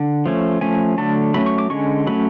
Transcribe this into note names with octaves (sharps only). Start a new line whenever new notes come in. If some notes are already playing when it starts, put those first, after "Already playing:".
Already playing: D3
F3 A3 C#4
F3 A3 C#4 G#5
D3 F#3 A3 A5
F#3 A3 C#4 B5
C#6
D6
D3 G#3 C#4 C#6
F#3 A3 C#4 B5